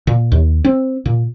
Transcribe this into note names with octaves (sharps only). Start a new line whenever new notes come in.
A#2
D#2
C4
A#2